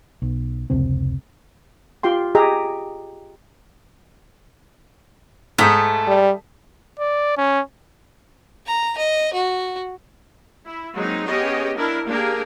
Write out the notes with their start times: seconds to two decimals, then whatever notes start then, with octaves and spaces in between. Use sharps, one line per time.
0.22 B1
0.70 F1 C#2 C3 C4
2.03 F4 G4 G5 C6
2.35 G4 G#4 D#5 A#5
5.58 G#2 A3 E5 D#6 G6
6.07 G3
7.00 D5
7.37 C#4
8.66 A#5
8.97 D#5
9.33 F#4
10.66 E4
10.95 F#3 G#3 A#3 C4 D#4
11.28 B3 C#4 G4 G#4 C#5 D#5
11.77 D4 E4 A#4
12.07 A#3 D4 G4 G#4 A#4